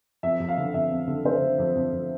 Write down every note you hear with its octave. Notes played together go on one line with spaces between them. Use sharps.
F2 E5
F2
F5
D3
F2 E5
F2
D3
D3 C5
D3
F2
F2
F2